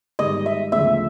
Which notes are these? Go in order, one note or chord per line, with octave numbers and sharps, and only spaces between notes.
G#2 D#3 G3 D#5
E5
D2 C#3 F3 E5